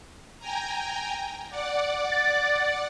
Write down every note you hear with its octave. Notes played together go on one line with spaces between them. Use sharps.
G5 G#5 A#5
D5 F#5 D6
A6